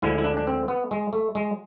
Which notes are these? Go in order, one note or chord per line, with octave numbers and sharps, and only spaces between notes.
D2 D3 F3 G#3 E4
E4
D4
D4
C4
B3
G#3
A3
G#3